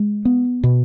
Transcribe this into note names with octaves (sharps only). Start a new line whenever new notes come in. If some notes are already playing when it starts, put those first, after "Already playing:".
Already playing: G#3
B3
B2